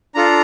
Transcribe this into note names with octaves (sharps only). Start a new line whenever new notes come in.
D4 F4 A4 A#5